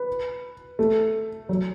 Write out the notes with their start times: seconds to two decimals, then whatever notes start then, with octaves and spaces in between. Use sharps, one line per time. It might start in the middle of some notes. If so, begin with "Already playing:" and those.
Already playing: B4
0.79 A3
1.49 F#3